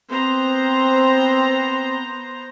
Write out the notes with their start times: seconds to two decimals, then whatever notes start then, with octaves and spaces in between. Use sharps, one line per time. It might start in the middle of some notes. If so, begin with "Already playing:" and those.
0.10 B3 C4 C5 A#5